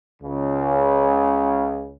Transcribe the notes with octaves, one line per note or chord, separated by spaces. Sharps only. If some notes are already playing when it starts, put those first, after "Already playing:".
C#2 C#3